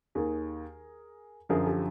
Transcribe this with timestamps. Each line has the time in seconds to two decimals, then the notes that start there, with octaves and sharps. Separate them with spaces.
0.15 D#2 D#3 G#4 A#4
1.49 F#2 D3 F3 G#4 A#4
1.66 G4 A4